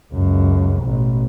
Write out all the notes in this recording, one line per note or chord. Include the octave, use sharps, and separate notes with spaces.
C#2 F#2
A1 B2